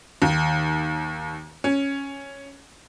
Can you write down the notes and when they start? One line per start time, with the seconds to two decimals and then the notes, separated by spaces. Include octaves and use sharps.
0.22 D#2
1.64 C#4